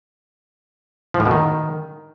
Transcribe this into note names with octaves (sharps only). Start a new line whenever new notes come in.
F3
A2
B2
D#3